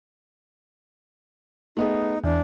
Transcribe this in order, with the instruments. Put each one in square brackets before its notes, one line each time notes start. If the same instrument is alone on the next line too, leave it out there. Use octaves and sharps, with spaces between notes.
[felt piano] A3 B3 G#4 [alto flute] D#4
[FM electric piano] E2 [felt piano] E3 [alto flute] D4